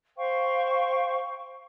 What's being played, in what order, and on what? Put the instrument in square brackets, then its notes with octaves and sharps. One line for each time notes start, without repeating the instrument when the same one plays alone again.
[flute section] C5 F5 G5 C#6